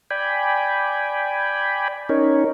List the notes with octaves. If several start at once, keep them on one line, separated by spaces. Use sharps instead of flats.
D5 G5 G#5 B5
C#4 D#4 A#4 C#5